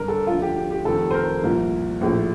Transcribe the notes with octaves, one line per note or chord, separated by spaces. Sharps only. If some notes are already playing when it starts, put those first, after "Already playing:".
Already playing: G1 G2 D3 A#4
A4
D2 D3 F3 F4
G4
G4
G4
F1 F2 D#3 A4
C5
A#4
C2 A#2 F3
A#1 A2 F3